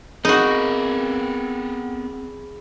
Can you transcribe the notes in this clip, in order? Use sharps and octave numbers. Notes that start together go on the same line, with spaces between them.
B3 C4 D#4 F#4 G#4 A#4 B5